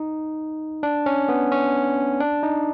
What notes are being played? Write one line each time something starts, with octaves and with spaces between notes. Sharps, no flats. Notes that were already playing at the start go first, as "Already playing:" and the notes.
Already playing: D#4
D4
C#4
B3
C#4
D4
D#4